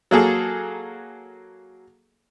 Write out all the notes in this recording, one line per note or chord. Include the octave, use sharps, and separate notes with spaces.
F#3 A#3 G#4 A4